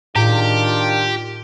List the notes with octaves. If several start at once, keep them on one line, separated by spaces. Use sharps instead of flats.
A2 D#3 D4 F4 G4